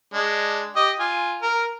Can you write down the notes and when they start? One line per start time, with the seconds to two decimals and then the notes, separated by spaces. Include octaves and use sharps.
0.14 G#3 D4
0.76 G4 D#5
1.00 F4 G#5
1.42 A#4